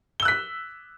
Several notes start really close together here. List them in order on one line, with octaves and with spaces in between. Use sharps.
G7 E6 F#6 B6